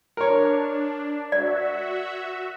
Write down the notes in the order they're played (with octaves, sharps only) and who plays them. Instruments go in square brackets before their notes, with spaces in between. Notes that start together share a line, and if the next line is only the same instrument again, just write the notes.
[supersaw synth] D4 [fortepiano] A#4 C#5
[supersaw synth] F#4 E5 [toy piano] D5